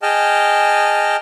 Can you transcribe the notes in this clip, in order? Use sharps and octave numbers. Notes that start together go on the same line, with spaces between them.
G#4 D#5 G5 A5 F6